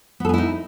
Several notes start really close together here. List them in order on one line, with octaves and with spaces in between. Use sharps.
B3 A4 G#4 E4 D#4